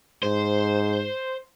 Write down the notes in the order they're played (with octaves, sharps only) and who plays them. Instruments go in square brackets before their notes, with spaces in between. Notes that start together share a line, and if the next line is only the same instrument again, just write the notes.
[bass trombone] G#2 [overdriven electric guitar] C5